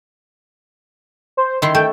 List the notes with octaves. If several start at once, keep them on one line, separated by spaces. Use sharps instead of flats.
C5
D#3 E4 C6
A3 G5